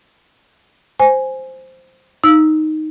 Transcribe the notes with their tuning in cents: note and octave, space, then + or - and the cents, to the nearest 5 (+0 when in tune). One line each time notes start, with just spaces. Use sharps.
C5 +0 G#5 +0
D#4 +0 E6 -5